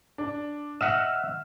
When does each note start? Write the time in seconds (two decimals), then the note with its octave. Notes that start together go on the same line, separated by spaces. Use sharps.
0.18 D4
0.81 D#5 E5 F#5 E6 F6 E7